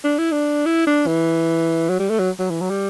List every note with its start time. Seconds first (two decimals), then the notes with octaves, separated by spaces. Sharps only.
0.04 D4
0.18 E4
0.32 D4
0.66 E4
0.87 D4
1.07 E3
1.89 F#3
1.99 G3
2.09 A3
2.19 F#3
2.39 F#3
2.50 E3
2.61 F#3
2.70 G3